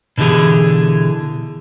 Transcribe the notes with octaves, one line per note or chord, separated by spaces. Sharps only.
B2 D3 E3 G4 G#4